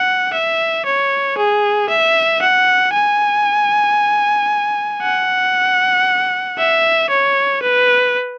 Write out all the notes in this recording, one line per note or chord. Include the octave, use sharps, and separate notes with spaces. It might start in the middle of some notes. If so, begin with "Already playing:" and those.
Already playing: F#5
E5
C#5
G#4
E5
F#5
G#5
F#5
E5
C#5
B4